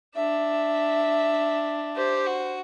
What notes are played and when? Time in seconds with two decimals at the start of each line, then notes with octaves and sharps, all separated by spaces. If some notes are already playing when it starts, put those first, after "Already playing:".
0.15 D4 E5
1.96 G4 C5
2.26 F#4